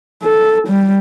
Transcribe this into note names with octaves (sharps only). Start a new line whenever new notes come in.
A4
G3